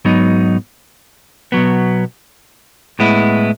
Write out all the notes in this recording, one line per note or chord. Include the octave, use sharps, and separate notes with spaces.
G#2 F#3 B3 D#4
B2 F#3 B3
A2 G#3 B3 E4